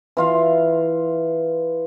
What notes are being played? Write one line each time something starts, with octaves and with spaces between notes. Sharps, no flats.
E3 F4 F5